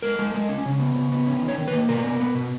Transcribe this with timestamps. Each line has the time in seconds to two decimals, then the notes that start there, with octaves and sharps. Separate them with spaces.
0.02 G#3 A#4
0.19 G#3
0.34 G#3
0.49 C#4
0.65 C#3
0.80 B3
0.95 C#3
1.12 B3
1.27 C#4
1.42 D#3
1.48 C#5
1.58 D#3
1.68 B4
1.73 A#3
1.89 B2 A#4
2.04 B3
2.20 B3
2.35 B2